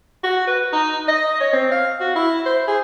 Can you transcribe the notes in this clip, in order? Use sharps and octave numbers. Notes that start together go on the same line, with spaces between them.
F#4
B4
D#4
D#5
C#5
C4
F5
F#4
E4
C5
G#4